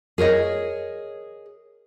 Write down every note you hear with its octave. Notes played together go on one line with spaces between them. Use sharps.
G#4 A#4 C#5 D#5